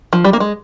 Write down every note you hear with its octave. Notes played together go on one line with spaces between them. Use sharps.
F3
G3
A#3
G#3